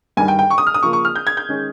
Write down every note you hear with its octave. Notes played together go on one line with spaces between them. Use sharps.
G2 D#3 G3 G#5
G5
G5
C#6
D#6
F6
D#6
C#3 F3 A#3 C#6
C#6
F6
G6
G#6
G6
D#3 G#3 C#4